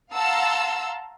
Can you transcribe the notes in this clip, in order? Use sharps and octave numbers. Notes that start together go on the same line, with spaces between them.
F5 F#5 A5 A#5 C6 E6